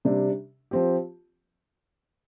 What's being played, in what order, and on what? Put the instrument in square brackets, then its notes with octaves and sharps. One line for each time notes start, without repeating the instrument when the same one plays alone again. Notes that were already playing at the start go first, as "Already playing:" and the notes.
[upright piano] C3 G3 D4
F3 C4 G4